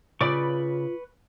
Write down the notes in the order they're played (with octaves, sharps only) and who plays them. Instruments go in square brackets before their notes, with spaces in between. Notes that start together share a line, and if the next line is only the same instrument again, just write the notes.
[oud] C#3 D5 [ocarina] F4 [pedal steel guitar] B4 B5 C#6